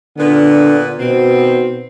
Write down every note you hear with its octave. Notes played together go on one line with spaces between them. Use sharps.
A#2 D3 B3
B2 D#3 B3 C4